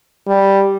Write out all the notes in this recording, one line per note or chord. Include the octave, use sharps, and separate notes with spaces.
G3